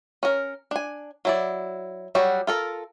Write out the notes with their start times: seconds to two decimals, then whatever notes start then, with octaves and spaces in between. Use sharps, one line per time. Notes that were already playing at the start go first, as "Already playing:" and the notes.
0.23 C#4 A#4
0.71 D4 G#5
1.25 F#3 E4 D5
2.15 F#3 G3 F#4
2.47 F4 A4 A#4